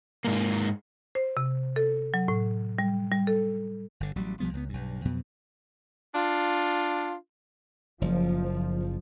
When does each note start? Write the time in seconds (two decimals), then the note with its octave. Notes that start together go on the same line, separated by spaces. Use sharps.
0.25 G#2 A#3
1.15 C5
1.37 C3
1.76 A4
2.14 F#3
2.28 A2
2.79 G3
3.12 G3
3.27 A4
4.00 G1 D3
4.16 A1 F#3 G3
4.40 B1 F3 G3 B3
4.53 C#2 F#3 B3
4.69 B1 G2
5.05 F2 B2 F#3 B3
6.15 D4 F4
8.01 F#1 F3